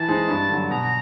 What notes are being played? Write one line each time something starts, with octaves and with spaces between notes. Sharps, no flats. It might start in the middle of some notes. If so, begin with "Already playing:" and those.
Already playing: E3 A5
G#3 C4 D#4 G#4
G2
D3
F#3
B2 A#5